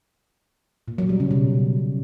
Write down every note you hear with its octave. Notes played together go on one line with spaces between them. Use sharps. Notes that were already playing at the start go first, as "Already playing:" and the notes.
A#2
F#3
G3
C#3
B2